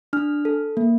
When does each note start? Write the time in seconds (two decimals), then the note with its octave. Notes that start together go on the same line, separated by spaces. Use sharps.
0.13 D4 F6
0.45 A4
0.77 A#3